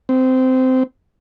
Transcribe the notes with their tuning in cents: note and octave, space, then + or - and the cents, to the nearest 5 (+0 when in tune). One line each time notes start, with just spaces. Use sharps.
C4 -20